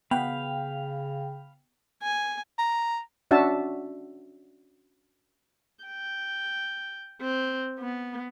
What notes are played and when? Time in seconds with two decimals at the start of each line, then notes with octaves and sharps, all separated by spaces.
0.11 C#3 B3 F5 G5 B5
2.02 G#5
2.58 A#5
3.31 C#4 D4 F#4 E5 A5
5.85 G5
7.21 C4
7.79 B3